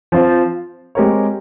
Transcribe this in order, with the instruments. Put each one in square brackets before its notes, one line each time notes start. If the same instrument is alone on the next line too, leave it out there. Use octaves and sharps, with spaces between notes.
[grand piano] F3 C4 F4 C5
G#3 C4 G4 A#4 C#5